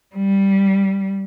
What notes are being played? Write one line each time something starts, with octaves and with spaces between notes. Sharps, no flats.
G3